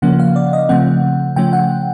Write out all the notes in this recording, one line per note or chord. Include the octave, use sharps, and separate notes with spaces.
C#3 F3 A#3 C#4 F#5
F5
D5
D#5
C#3 F3 A3 C4 F#5
C#3 F3 A3 C#4 G5
F#5